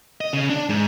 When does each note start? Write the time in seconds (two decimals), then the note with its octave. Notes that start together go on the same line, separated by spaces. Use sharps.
0.21 D#5
0.33 C#3
0.50 D4
0.69 G#2